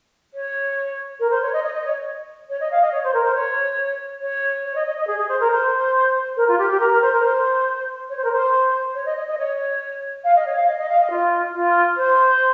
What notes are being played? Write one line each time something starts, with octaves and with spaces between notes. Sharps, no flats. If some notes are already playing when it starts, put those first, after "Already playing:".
C#5
A#4
C5
C#5
D#5
D#5
D#5
C#5
C#5
D#5
F5
D#5
C#5
C5
A#4
C5
C#5
C#5
C#5
D#5
D#5
D#5
G#4
G#4
C5
A#4
C5
A#4
F4
G4
G4
A#4
A#4
C5
A#4
C5
C#5
C5
A#4
C5
C#5
D#5
D#5
D#5
C#5
F5
D#5
C#5
F5
D#5
D#5
F5
D#5
F4
F4
C5